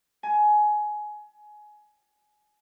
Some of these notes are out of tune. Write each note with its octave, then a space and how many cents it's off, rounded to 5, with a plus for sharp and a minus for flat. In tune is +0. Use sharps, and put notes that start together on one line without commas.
G#5 +20